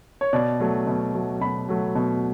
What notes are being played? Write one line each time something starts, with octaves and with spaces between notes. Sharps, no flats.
C#5
B2 D5
F#3 A3
B2
F#3 A3
B2 B5
F#3 A3
B2